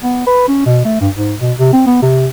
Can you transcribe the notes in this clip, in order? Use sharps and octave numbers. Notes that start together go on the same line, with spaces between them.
B3
B4
C#4
B2
A3
G2
G#2
B2
C3
C4
B3
C3